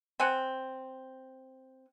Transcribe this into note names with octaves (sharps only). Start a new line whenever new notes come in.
C4 F#5 G#5